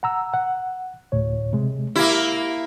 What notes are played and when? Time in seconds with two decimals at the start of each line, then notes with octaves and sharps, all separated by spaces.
0.03 F#5 A#5 E6
0.34 F#5
1.12 D2 A2 C#5
1.53 C3 G#3
1.96 A#3 E4 G4